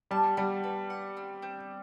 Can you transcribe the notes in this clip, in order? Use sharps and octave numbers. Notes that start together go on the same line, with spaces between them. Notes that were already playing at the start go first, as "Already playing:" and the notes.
G3 A5
G3 F#4
B4
F#5
C4
C4